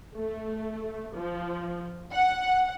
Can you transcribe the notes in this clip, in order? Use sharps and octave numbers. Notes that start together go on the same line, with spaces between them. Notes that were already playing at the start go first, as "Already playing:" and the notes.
A3
F3
F#5